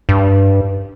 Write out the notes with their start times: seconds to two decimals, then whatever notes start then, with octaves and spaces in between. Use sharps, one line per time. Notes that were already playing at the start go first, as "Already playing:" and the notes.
0.09 G2